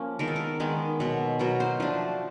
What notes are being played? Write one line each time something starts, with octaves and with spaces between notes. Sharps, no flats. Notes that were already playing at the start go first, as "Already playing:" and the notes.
Already playing: F3 A#3 C#4
D#3 G#3 B3 A#4
A4
A#4
D#3 G#3 B3
B2 F#3 B3
B2 F#3 B3 A#4
C5
F3 A3 D4